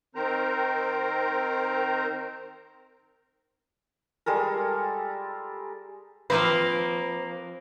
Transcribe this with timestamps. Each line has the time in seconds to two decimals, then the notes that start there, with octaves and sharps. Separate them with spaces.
0.15 D#3 C4 A#4 C5 A#5
4.26 G3 G#3 A4 A#4
6.30 F3 A#3 C4 B4 C5